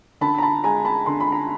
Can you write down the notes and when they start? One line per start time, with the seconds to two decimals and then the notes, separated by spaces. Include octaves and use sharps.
0.21 D3 A5 B5
0.38 A#5
0.42 A5 B5
0.64 G#3 G#5 A#5
0.85 A5 B5
1.06 D3 C6
1.20 B5
1.32 A#5